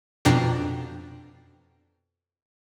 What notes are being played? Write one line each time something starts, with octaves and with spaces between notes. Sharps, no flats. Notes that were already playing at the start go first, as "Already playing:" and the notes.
F2 B2 D4 G5 A#5 C7